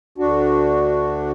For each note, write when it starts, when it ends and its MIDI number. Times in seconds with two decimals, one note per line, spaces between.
0.18 1.32 38
0.18 1.32 62
0.18 1.32 66